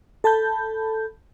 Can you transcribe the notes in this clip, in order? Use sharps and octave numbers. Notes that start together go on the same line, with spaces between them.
A4 A5 B5 G6